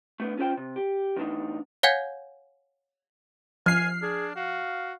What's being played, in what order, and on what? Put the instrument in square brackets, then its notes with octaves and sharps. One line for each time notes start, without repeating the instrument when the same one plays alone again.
[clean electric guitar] A3 B3 D4
C#4 F4 G#4 C5 G5
C3
G4
E2 A2 D4 D#4
[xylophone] C#5 F5 F#5 G#5 G6 G#6
[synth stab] F3 C7 [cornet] G#5 [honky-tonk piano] F6
[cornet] D4 [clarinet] G#4
[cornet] F#4 [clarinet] F5